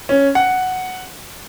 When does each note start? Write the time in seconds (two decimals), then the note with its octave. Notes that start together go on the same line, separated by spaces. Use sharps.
0.09 C#4
0.35 F#5